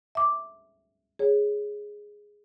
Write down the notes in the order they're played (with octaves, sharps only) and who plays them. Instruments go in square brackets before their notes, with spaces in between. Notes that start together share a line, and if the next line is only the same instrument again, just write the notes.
[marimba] E5 D6
G#4 C#5